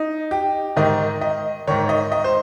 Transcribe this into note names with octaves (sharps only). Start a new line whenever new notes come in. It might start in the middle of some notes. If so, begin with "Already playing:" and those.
Already playing: D#4
G4
G#2 D#3 D#5
D#5
G#2 D#3 C#5
D#5
D#5
C5